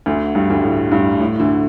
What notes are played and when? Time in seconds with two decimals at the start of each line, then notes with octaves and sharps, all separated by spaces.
0.06 D2 D3
0.35 G2 G3
0.50 D2 D3
0.63 A2
0.92 G2
1.20 A2
1.40 D2 D3